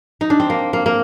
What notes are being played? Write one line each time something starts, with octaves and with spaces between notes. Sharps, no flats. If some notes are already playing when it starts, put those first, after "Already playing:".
D#4
D4
C4
A#3
A#3
A#3